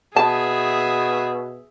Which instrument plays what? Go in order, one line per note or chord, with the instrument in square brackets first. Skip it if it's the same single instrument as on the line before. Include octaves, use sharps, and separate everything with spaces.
[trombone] B2 [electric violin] G#4 E5 [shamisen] A5